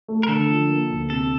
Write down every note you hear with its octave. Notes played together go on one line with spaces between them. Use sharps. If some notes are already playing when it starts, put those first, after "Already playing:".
A3
A#4
D3 A4
F3
A#3
D2
C3 A4